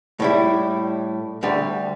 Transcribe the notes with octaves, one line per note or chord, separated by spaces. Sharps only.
A2 G3 E4
D2 D3 G3